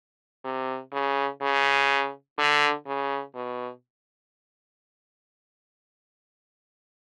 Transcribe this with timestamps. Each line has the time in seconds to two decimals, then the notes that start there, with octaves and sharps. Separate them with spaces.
0.45 C3
0.93 C#3
1.42 C#3
2.38 D3
2.87 C#3
3.35 B2